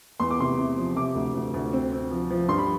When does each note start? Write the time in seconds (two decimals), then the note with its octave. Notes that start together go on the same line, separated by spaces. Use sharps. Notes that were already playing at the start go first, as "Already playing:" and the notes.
0.20 E2 C6
0.31 D6
0.39 C3 C6
0.58 C3
0.77 F3
0.96 C3 D6
1.15 D2
1.34 D2
1.54 D2
1.73 C4
1.92 C4
2.11 F3
2.30 F3
2.48 G2 C6
2.58 B5